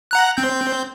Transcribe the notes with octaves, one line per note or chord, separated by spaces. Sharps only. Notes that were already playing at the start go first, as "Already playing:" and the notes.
F#5 A#5 F#6
C4 G6